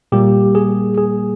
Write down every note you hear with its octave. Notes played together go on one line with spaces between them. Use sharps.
A#2 G3 A#3 G4
G#4
G#4